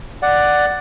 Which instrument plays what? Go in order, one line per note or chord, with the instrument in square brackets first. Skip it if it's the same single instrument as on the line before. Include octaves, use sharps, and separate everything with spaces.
[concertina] D5 F#5